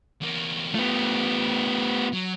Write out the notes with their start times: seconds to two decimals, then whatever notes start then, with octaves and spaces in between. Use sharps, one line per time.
0.22 E2 A#3
0.75 A3 B3 F4 G4
2.13 F#3